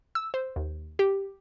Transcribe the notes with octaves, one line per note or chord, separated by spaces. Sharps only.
E6
C5
D#2
G4